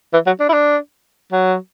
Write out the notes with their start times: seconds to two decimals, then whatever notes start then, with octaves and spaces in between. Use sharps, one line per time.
0.13 E3
0.26 F#3
0.40 D4
0.49 E4
0.53 D4
1.32 F#3